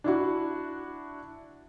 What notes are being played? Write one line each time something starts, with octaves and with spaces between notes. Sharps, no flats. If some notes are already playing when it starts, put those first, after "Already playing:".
D4 E4 F#4